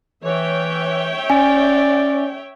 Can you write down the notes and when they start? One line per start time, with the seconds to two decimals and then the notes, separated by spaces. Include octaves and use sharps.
0.24 E3 C#5 E5 G5
1.30 C#4 D5 G#5